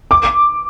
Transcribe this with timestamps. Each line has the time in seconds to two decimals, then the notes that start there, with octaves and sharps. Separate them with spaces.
0.11 D6